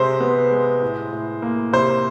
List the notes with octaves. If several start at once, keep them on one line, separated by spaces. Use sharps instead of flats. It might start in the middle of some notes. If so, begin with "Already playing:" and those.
Already playing: C3 G#3 C5
B3
G#3
A2
A2
A#3
C3 C5